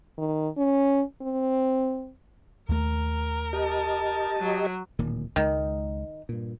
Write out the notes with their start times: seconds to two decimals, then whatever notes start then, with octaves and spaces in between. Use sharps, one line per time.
0.18 D#3
0.58 C#4
1.22 C4
2.69 D#2 A3 A#4
3.53 G4 D#5 A5
4.39 F#3
4.99 D1 A#2 D#3
5.36 C#2 D#3 G#3
6.29 G2 A#2